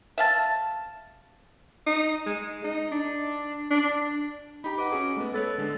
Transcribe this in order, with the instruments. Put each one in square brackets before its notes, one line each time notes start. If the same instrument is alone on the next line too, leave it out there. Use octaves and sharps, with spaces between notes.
[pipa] E5 F5 A5
[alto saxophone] D#4
G#3
D#4
D4
D4
[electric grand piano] D#4 G4 A#5 [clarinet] B5
[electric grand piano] B4 D#5 F#5 [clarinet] D6
[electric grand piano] C#4 F#4 G#4
[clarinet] G#3 [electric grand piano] A3 B3
[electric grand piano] B3 B4 C#5 [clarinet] A4
[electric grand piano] D3 G#3 D4